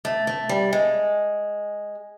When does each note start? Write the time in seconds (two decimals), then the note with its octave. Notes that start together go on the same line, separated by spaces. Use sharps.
0.05 A3
0.27 A3
0.49 G3
0.73 G#3